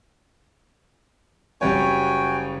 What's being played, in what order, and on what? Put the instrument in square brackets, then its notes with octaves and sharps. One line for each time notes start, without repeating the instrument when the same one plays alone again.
[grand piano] F#1 G3 C#5 [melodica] F#4 G5 G#5